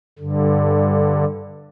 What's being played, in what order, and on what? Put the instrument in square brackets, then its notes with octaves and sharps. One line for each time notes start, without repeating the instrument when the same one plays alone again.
[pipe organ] G2 D3